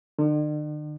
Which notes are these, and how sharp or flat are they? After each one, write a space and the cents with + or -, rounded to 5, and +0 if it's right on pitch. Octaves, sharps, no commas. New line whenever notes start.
D3 +45